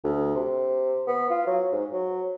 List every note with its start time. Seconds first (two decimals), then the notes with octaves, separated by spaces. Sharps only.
0.04 D2
0.34 C3
1.07 B3
1.30 F4
1.47 F#3
1.72 G#2
1.93 F#3